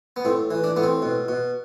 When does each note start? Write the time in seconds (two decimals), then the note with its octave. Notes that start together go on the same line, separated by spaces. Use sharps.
0.16 B3
0.25 A2 C4
0.51 E3
0.64 D4
0.76 A2 B3
0.83 C4
1.02 B2
1.29 B2